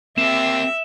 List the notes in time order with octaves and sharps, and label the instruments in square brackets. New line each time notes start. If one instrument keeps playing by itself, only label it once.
[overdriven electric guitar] A#3 G4 [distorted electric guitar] C4 [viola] E5 [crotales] E7